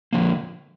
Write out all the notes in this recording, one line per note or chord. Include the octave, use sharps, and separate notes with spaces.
D3 F3 A#3